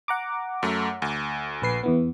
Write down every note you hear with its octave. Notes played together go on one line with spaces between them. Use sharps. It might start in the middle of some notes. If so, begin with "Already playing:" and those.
F#5 A#5 D6
F#2 A3
D2
A#1 B4 C7
E2 E3 B3